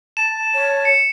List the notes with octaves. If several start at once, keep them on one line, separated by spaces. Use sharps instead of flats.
A5 E7
C#5
C#7